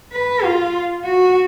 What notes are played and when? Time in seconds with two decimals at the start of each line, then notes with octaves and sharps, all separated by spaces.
0.12 B4
0.44 F4
1.05 F#4